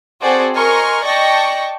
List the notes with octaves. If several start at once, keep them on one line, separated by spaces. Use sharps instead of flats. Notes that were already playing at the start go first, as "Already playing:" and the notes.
C4 F#4 G#4 A4 C5 D5
A#4 D#5 G#5 C6 C#6 F6
D5 D#5 G5 A5 C#6 A#6